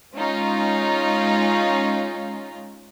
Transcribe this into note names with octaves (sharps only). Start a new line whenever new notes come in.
G#3 C#4 D#4 F4